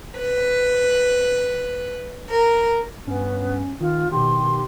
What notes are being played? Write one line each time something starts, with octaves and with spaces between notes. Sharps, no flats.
B4
A#4
G2 B3 C#4
D#3 F4
B2 D#3 G4 C6